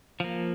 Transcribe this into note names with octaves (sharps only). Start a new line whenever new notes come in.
F3 A#3